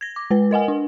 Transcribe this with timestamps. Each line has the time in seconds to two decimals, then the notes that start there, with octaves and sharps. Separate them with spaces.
0.01 G#6 A#6
0.16 D6
0.31 G#3 B4
0.51 A#4 D#5 F#5 G#5
0.68 D4